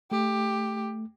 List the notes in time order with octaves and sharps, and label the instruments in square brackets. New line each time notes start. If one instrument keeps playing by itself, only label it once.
[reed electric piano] A3 [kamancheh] G4